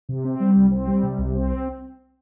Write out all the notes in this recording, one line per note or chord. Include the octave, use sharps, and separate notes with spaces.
C3
C4
G3
C2
C4
G3
C3
C2
C4